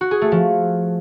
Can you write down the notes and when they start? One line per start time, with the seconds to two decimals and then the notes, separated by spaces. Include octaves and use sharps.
0.01 F#4
0.11 G#4
0.21 A3
0.32 F3